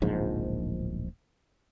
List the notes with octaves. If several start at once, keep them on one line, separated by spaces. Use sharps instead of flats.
D1 A#1 G#2 F3